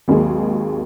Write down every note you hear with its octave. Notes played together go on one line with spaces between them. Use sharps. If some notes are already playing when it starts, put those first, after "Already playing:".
G#1 D#2 D#3 F#3 G#4